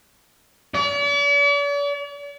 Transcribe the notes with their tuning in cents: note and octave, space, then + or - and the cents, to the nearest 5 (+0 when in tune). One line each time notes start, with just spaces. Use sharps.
D5 -45